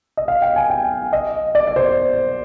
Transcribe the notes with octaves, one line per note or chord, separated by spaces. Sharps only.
D#5
F5
G5
G#5
G5
D#5
D5
D5
C5